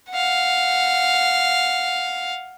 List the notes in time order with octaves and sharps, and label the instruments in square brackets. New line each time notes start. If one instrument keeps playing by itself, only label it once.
[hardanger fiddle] F5 F#5